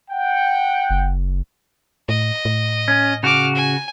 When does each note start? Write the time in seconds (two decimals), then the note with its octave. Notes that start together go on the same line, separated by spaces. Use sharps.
0.11 F#5 G5
0.90 F#1
2.09 A2 D#5
2.45 A2
2.88 C#4
3.23 C#3 F#4 D6 F6
3.55 G#5